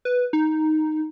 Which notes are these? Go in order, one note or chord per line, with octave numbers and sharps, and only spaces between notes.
B4
D#4